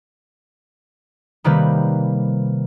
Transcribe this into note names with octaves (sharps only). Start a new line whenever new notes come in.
C3 D#3 G3 A#3 B4